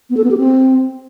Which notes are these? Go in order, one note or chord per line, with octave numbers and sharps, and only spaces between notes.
B3
A4
B3
G4
C4